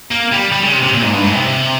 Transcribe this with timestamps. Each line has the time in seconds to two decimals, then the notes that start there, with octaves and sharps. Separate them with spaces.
0.11 A#3
0.32 G3
0.52 G3
0.63 C#3
0.72 C3
0.83 C3
0.94 A#2
1.03 G#2
1.13 G2
1.23 G#2
1.34 C3